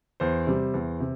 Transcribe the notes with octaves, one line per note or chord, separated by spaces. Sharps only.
E2 C5
C3 G3
E2
C3